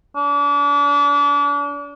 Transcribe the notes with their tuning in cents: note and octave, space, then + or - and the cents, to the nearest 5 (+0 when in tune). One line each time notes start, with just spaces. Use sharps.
D4 -35